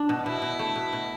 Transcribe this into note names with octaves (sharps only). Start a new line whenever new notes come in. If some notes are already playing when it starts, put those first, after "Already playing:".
Already playing: D4
B2
B2 E4
B2
A3
B2
B2